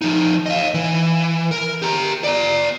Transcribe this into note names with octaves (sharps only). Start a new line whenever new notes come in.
F3 D#4
D#5 F5
E3
A#4
G4 A#5
D5 A#5